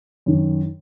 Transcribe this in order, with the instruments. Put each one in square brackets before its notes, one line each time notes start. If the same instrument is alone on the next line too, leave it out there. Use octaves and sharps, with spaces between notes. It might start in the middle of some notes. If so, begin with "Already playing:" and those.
[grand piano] F#2 D#3